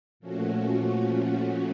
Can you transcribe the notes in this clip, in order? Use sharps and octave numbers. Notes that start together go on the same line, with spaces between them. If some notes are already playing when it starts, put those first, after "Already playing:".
A#2 F3 A3 C#4 F#4